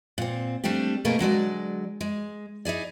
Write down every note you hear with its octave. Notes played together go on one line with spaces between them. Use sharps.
A#2 C4
G3 A3 C4 D4 G4
B2 A3 A#3 G#4 A#4
D3 F#3 G#3 D5
G#3
D#4 E4 G#4 D5